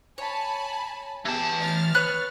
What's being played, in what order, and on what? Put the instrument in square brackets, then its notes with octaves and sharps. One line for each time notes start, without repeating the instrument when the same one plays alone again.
[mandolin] C#5 [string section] G#5 A5 B5
[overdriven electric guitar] E3 A5 [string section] B3 G4 G#4
[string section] F6 A6
[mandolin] B3 C#5 F#6